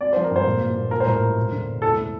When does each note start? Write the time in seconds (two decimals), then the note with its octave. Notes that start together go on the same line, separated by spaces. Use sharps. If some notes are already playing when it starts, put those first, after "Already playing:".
0.01 C4 D5
0.13 F3 C5
0.24 A#4
0.31 G2 C5
0.46 A#2
0.61 A#2
0.77 A#2
0.91 F4 A#4
1.00 C5
1.07 A2 A#4
1.22 G3
1.37 E1
1.52 D3
1.67 E1
1.82 E4 A4
1.97 A3